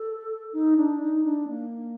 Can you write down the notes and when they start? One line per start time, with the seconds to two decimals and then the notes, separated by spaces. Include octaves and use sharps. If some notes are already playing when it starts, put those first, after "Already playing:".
Already playing: A4
0.53 D#4
0.77 D4
1.01 D#4
1.24 D4
1.48 A#3